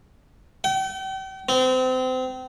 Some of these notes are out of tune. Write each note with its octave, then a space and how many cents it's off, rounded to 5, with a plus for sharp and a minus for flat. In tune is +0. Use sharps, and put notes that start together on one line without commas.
G5 -40
C4 -30